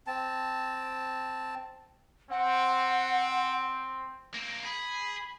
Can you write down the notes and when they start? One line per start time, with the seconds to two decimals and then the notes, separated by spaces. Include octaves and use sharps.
0.07 C4 A5
2.30 C4 F#5
4.34 A#3 C4
4.65 G#4 B5